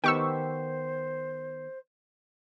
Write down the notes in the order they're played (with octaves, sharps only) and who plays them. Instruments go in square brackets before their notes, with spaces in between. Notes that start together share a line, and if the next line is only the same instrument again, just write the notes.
[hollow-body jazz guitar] D#3 B3 G4 [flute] C5 [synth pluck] G5 C#6 E6